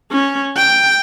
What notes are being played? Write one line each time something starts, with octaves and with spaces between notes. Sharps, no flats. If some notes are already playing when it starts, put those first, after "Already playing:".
C#4
G5